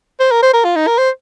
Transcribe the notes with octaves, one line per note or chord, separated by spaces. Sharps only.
C5
A#4
C5
A#4
F4
D#4
A#4
C5